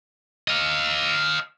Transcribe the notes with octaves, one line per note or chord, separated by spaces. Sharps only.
D#5 F5